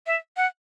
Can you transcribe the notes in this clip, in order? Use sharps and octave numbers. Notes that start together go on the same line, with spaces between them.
E5
F#5